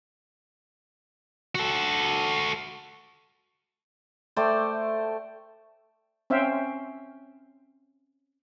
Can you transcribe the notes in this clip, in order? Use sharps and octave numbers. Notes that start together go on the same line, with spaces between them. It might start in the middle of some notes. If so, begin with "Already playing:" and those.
F#4 A4
A3 C5 D5 G5
C4 C#4 C5 E5 F5 G5